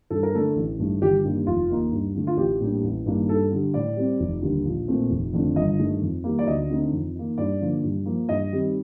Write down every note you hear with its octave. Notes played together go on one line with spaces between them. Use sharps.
G2 A4
A#4
D3 A3 D4 A4
A1
G2 D#3 A3
G1 G4
G2 D#3 G3 A#3
F1 F4
D#2 D#3 A#3 D#4
G2
D3 A3
F4
A1 G4
A2 G3 A#3 D4
A1
G2 D#3 A#3 D4
G2 A4
D3 G3
A2 D5
G3 C4
F1
D#2 D3 G3
A#1
A#2 A3 C4
F1
F2 D3 A3 D4
G1 D#5
G2 D#3 A3
F2
D#3 G3 A#3
D5
D2 D#5
D3 A3 C4 D#4
F2
D#3 A#3
G2 D5
D3 F3 A#3
G2
F3 A#3
G2 D#5
D#3 G3 C4